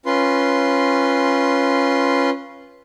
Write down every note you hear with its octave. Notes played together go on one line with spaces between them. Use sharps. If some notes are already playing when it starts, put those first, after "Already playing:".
C#4 F4 B4 C6